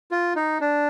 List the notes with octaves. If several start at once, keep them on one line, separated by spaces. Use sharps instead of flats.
F4
D#4
D4